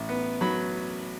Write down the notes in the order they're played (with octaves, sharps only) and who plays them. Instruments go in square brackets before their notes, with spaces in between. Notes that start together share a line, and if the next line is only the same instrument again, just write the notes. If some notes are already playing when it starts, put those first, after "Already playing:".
Already playing: [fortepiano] A1
B3
F#3 B5